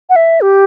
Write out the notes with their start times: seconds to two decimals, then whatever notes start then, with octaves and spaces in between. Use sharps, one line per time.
0.10 F#5
0.16 E5
0.41 G4